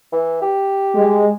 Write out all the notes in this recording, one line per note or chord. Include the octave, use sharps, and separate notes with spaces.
E3
G4
G#3